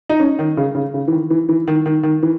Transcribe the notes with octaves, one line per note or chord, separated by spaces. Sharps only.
D#4
C#4
D#3
C#3
C#3
C#3
E3
D#3
E3
E3
D#3
D#3
D#3
E3